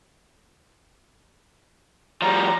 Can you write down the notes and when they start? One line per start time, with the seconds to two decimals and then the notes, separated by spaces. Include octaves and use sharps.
2.22 F3 G3 A#5